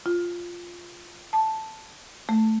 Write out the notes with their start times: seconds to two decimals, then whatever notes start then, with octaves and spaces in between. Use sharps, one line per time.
0.06 F4
1.33 A5
2.29 A3